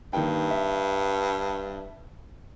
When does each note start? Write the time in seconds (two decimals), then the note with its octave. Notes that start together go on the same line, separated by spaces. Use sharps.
0.13 G2 D#3 A#3 G5
0.51 E5